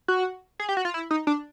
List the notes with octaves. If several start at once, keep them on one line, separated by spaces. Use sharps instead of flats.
F#4
G#4
G4
F#4
F4
E4
D#4
D4